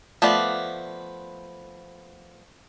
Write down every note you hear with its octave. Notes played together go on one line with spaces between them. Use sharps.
F3 A3 B3 D5